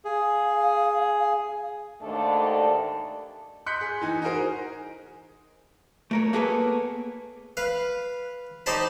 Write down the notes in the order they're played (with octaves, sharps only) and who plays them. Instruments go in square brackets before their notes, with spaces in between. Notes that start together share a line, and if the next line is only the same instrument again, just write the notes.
[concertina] G#4 [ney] F5
[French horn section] D#2 G#2 A3 D4 A4 D5
[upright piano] D#5 C6 F#6 G6 B6 C#7
G#4
E3 D#4 G#5
D#4 F#4 G#4 A#4 C5 D#5
[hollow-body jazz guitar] A3 A#4 C#5
A#3 B3 G#4 A4 B4 C#5
[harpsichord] B4 F5
D#4 G4 C5 G5 A5 B5